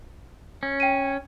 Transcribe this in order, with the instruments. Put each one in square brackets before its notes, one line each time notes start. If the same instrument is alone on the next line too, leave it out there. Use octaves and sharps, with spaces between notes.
[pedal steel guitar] C#4
[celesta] G5 D#7